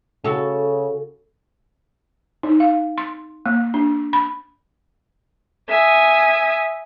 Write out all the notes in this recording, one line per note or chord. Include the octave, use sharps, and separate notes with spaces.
C#3 F#4 A4
D#4
F5
C6
A#3
D4
B5
E5 G#5 D#6